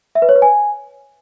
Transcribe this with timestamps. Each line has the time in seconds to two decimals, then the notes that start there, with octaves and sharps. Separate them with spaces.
0.15 E5
0.22 B4
0.29 C#5
0.35 B4
0.42 G#5